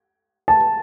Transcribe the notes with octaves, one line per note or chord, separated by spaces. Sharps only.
A5